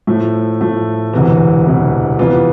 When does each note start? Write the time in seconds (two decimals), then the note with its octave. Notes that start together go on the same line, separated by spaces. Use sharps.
0.07 A2 F3 A3
0.61 A2 F3 A3
1.13 E1 D2 C3 E3
1.66 E1 D2 C3 E3
2.19 F2 C3 E3 B3 F4